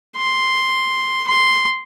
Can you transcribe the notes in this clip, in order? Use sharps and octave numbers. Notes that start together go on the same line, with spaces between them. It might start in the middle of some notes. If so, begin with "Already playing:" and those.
C6
C6